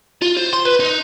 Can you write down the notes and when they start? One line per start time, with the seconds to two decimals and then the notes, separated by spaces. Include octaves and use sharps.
0.22 F4
0.37 C5
0.53 C6
0.65 B4
0.80 D#4